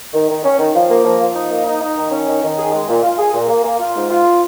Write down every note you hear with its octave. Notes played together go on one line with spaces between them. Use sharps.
D#3
D#3
C#4
D#3
F3
A#3
F3
F3
D#4
A#3
D#4
D#4
D#3
C#4
D#3
D#3
G#4
G#3
A#2
F4
G#4
A#2
A#3
A#3
F4
G#2
F4